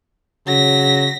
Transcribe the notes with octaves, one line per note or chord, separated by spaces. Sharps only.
C#3 F#3 A#6 B6